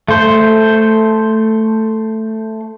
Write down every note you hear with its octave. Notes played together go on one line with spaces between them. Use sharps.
A3 C5